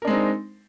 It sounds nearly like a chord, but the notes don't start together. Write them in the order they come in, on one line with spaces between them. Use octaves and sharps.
A#4 D4 G#3 C4 D#4